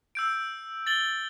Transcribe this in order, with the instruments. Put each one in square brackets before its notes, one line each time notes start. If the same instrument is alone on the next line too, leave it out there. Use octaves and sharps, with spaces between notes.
[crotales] E6 G6 D7
A6 F#7 G7